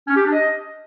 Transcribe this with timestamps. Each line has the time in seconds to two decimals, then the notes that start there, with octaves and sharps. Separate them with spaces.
0.08 C#4
0.16 G4
0.24 D4
0.32 D#5